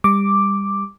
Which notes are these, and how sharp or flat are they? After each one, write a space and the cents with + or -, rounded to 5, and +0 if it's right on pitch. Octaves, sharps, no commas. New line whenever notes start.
G3 +25 D6 +0